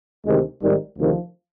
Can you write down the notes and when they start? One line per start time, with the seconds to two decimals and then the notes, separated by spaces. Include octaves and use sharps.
0.25 D2 C3 D#3 G#3
0.60 G#1 G#2 D#3 G3
0.97 D2 C3 D#3 F3